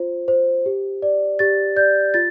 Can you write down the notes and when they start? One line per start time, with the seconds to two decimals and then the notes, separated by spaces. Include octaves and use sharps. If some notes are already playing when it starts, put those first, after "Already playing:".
Already playing: F4 C5
0.28 C5
0.66 G4
1.02 D5
1.39 G4 A6
1.76 D5 G6
2.14 F4 A6